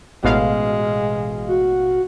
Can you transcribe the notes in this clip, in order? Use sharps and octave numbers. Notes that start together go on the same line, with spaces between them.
A1 B2 G#3 F5
F#4